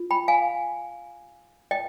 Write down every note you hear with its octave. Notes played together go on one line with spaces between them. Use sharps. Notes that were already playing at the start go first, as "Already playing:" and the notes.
Already playing: F4
G5 B5
F5 G#5
D#5 G5